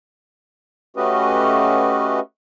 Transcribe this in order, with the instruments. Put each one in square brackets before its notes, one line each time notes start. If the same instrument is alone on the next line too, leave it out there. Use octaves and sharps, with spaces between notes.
[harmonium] A3 C#4 F#4 G4 B4 D#5